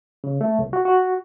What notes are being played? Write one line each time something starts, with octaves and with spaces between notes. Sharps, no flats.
C#3
A3
C2
F#4
F#4